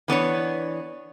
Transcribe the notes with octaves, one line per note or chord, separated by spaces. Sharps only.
E3 B3 D4 C#5